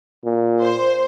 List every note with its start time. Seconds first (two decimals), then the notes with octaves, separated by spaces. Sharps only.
0.24 A#2
0.61 C5